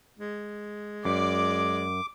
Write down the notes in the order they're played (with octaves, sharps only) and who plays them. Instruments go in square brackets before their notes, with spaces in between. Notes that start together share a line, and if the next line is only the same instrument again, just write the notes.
[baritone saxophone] G#3
[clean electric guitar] F#2 [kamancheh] D5 [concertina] D6